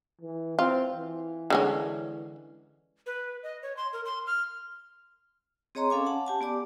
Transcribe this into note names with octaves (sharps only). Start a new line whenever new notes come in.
E3
C4 F4
E3
D3 G#3 C#4
B4
D#5
C#5
C6
A#4
C6
F6
C4 G#4 C#5 D#5 A#5 C6
C#4 A4 F5 G#5 D6
F#5 A5
G4 G#5 A5
B3 G4 D5 D6